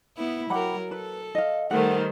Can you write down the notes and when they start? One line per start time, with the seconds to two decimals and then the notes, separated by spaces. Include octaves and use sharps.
0.17 B3 E4
0.50 F#3 G4 A#4 F#5 B5
0.91 A4 B4
1.35 D#5 F5
1.71 D#3 G3 A3 C5 F#5